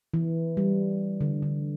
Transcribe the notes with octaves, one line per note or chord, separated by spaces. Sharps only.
E3
G3
D3
D3